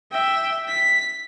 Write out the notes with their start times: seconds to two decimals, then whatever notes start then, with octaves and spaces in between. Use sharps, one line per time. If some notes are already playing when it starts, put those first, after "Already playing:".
0.12 E5 G5
0.68 B6